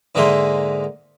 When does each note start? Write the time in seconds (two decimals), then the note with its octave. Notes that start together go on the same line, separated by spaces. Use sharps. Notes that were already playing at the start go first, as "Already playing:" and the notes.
0.15 G#2 D3 A#3 G#4 E5 C6